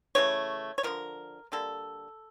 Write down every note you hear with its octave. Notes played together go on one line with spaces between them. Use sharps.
C#3 E3 A3 C#5
C#5
D3 F3 A3 A#4
D3 G3 A#3 A4